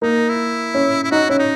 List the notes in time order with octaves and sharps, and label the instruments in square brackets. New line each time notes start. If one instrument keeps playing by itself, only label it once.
[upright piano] A#3 [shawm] D#4
[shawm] E4
[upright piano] C#4
[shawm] E4
[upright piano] D#4 [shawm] F#4
[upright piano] C#4 [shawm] E4
[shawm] D#4